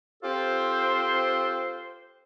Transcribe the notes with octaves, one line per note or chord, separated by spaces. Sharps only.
C4 F4 G4 A4 C5